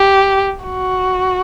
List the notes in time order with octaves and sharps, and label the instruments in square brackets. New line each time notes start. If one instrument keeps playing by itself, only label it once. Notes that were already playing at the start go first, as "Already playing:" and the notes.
Already playing: [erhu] G4
F#4